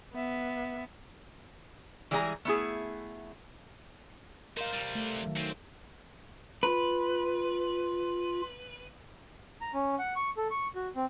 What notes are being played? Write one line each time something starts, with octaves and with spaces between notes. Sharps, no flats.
B3 E5
E3 G3 G#3 G#4 C5 A#5
A3 B3 E4 G#4
D#4 A#4 C5 F5
C3 G3
A3
D#3 F#3
C4 C#4
F4 B4
A#5
C#4
F#5
C#6
A4
C#6
F#4
C4